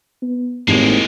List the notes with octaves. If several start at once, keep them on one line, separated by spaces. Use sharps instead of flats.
B3
G#1 D#2 A2 G#3 A#3